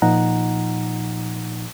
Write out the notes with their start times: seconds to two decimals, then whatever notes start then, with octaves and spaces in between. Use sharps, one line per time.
0.02 A#2 F3 D#4 F#5 A#5